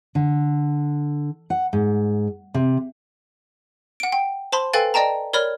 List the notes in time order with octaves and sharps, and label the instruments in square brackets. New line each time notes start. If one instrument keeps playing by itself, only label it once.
[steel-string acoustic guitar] D3
F#5
G#2
C3
[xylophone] F#5 D7
G5
C5 A5 B5 C6
A4 B4 F5 G5 G#5 A6
D5 D#5 G5 A5 A#5
A#4 C#5 D5 B5 F6